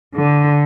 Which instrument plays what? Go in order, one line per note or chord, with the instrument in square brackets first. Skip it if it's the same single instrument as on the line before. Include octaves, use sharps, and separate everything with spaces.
[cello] D3